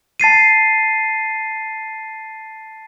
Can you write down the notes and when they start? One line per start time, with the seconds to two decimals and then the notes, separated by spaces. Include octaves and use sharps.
0.20 A5 A6 C7 D#7